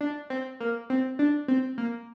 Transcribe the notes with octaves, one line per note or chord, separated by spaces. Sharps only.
D4
C4
A#3
C4
D4
C4
A#3